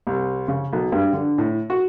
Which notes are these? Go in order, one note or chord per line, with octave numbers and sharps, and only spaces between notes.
C2
C#3
B1
G2
D3
A2
F#4